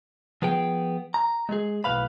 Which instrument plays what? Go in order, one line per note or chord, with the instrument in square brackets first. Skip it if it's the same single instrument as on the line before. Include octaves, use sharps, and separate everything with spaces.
[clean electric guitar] F3 B3 G#4 G5
A#5
G#3 G#4
B1 A2 E3 B4 F5 B5